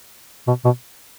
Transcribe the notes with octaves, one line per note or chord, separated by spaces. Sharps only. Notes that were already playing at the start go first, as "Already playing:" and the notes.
B2
B2